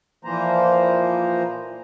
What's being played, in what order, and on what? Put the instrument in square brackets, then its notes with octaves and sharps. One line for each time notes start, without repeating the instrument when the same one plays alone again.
[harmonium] A#2 E3 F3 A#3 C5 A#5